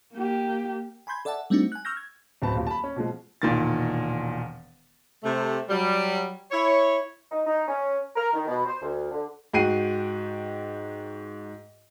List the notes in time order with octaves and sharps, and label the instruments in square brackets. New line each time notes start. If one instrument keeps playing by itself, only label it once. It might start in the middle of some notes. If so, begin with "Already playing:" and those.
[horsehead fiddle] A#3 G4
[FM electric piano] G#5 B5 C6 G6 G#6
A4 D5 E5 F#5 A5
G3 A3 C4 D4 D#4 F#4
G#5 F#6
C#6 E6 F6 G6 A#6
G#6
[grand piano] D1 B3 C4 A5 B5
D#1 F4
A5 B5
C#4
B2 F3 G#3
E1 A#2 D#3 A6
[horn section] C3 A3
F#3 G3
E4 C#5
[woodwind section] D#4
D#4
C#4
A#4
D#3
B2
C5
D2
D3
[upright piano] G#2 F#4 G5 C7 D#7